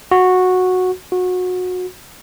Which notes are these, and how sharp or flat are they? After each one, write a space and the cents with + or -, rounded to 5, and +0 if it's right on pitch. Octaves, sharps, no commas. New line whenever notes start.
F#4 -10
F#4 -25